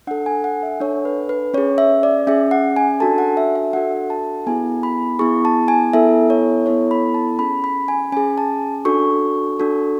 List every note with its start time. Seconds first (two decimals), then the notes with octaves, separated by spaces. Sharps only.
0.07 D4 A4 F#5
0.26 G#5
0.44 F#5
0.63 E5
0.81 D4 A4 C#5
1.05 B4
1.29 B4
1.54 C#4 G#4 C#5
1.78 E5
2.03 D5
2.27 C#4 G#4 E5
2.51 F#5
2.76 G#5
3.00 D4 F#4 A4 A5
3.18 F#5
3.37 E5
3.55 E5
3.73 D4 F#4 A4 F#5
4.10 A5
4.47 B3 E4 G#4 G#5
4.83 B5
5.19 B3 E4 G#4 C#6
5.45 A5
5.68 G#5
5.93 B3 E4 A4 E5
6.30 C#5
6.66 B3 E4 A4 C#5
6.91 B5
7.14 A5
7.39 C#4 G#4 B5
7.64 B5
7.88 G#5
8.12 C#4 G#4 G#5
8.38 A5
8.85 D4 F#4 A4 C#6
9.60 D4 F#4 A4